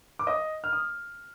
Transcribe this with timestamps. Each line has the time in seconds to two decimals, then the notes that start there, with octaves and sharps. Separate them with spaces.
0.19 D6
0.27 D#5 D#6
0.64 F6
0.73 D#6